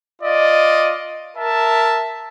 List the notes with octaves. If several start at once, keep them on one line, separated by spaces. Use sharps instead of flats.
F4 D5 D#5
A#4 E5 A5